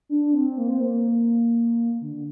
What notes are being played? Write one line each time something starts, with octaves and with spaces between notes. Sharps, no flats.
D4
C4
A#3
C4
A#3
D3